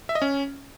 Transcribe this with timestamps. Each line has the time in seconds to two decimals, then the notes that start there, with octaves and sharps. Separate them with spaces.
0.09 E5
0.15 D#5
0.22 C#4